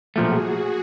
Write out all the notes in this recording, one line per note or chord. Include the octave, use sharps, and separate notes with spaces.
B1 A#2 F3 A3 F#4 G#4